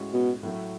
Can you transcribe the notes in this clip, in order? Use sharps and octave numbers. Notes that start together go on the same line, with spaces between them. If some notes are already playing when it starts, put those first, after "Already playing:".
Already playing: A2 G#3 C#4 F#4
B2
A2 F#3 A3